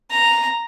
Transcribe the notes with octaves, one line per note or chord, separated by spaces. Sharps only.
A#5